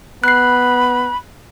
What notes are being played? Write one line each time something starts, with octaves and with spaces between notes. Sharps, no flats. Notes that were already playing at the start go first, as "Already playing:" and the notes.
B3 B5 F#6 C7